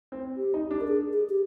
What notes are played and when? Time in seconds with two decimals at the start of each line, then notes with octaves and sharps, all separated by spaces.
0.12 C4
0.37 G4
0.54 D#4
0.71 D4
0.81 A#4
0.88 G#4
1.13 G#4
1.30 G4